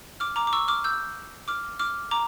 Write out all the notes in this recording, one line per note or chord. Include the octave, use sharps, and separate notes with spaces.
D6 F6
A#5 D6
D6
C#6 E6
D6 F6
E6 G6
D6 F6
D6 F6
A#5 D6